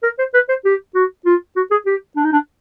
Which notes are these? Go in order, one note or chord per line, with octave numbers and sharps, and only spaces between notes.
A#4
C5
B4
C5
G4
F#4
F4
F#4
G#4
G4
D4
D#4
D4